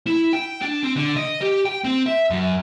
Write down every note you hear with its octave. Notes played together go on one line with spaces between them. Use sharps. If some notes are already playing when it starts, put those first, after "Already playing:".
E4
G5
D4
C4
D3
D#5
G4
G5
C4
E5
F#2